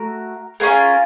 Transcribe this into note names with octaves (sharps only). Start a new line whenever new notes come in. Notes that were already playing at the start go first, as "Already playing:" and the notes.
Already playing: A3 F#4 A#4
C#4 F4 G#4 A#4